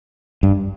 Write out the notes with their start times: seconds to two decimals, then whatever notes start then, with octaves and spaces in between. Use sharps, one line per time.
0.43 G2